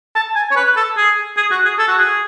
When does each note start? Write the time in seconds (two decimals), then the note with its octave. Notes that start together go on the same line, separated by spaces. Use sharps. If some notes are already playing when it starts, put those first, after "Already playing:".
0.15 A5
0.36 G#5
0.51 C#5
0.56 B4
0.76 A4
0.97 G#4
1.37 G#4
1.51 F#4
1.65 G#4
1.78 A4
1.88 F#4
1.98 G#4